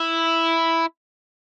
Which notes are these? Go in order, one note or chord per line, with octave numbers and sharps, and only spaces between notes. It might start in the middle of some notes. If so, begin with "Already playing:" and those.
Already playing: E4